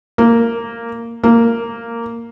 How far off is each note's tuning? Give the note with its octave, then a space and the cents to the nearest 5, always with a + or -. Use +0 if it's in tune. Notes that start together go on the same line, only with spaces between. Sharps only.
A#3 -10
A#3 -10